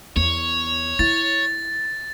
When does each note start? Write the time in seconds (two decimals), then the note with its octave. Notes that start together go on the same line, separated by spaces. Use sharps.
0.16 E2 C#5
0.99 E4 A6